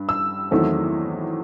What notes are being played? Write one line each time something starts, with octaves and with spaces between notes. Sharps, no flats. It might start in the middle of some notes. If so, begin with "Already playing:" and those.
Already playing: G2
E6
E2 D#3 F#3 A3 C4